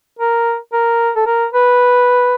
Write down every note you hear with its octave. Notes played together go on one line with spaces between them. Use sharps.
A#4
A#4
A4
A#4
B4